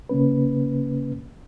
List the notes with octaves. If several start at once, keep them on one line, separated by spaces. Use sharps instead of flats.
C#3 A#3 C#4 B4